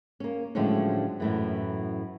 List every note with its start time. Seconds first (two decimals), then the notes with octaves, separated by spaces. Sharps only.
0.20 A#3 C#4
0.55 A2 D3 F3 F#3 G#3 C#4
1.20 F#2 A2 E3